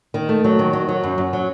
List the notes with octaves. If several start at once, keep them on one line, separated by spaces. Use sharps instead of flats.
D#3
A3
F#3
D#3
F#3
F#3
F#2
F#2
F#3